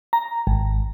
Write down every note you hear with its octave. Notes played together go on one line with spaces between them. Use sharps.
A#5
G#1